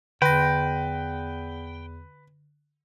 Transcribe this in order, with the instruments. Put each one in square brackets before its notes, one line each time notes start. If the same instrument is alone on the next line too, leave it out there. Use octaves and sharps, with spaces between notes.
[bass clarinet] E2 [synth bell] D3 A#6 [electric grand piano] B4 [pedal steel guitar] G5